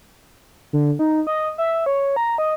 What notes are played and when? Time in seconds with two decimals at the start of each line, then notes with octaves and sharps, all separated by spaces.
0.73 D3
0.99 D#4
1.27 D#5
1.58 E5
1.86 C#5
2.16 A#5
2.38 D#5